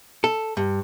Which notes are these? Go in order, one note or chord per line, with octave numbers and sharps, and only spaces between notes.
A4
G2